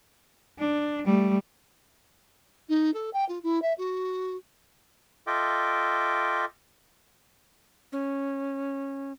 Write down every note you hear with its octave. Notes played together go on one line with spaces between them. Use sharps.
D4
G3 A3
D#4
A4
G5
F4
E4
E5
F#4
F4 A4 D#5 E5 G5 D6
C#4